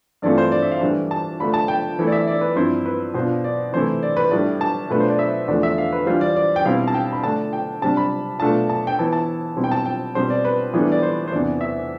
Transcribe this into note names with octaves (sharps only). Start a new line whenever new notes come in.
G2 E3 A3 C4 F4 D5
C5
D5
E5
F5
A2 E3 G3 D4
A5
D3 A3 D4 F4 B5
A5
G5
E3 A3 E4
D5
E5
D5
B4
G2 F3 C4 E4 C5
B4
B2 B3 D4 F4 C5
D5
C3 E3 A3 E4 C5
D5
B4
A2 G3 D4 D5
A5
B2 A3 D4 F4 B4
C5
D5
E5
E2 D3 F3 A3 D4 D5
E5
F5
B4
E3 G3 D4 F4 C5
D5
D5
G5
B2 G3 C4 E4 F5
A5
G5
B5
D3 A3 D4 A5
G5
C3 G3 D4 A5
B5
B2 A3 D4 F4 A5
A5
G5
E3 B3 E4 A5
A5
B2 G3 C4 E4
G5
A5
G5
B2 G3 C4 C5
D5
B4
A2 E3 G3 B3 D4
D5
C5
C5
E2 C3 E3 B3 D4 D5
E5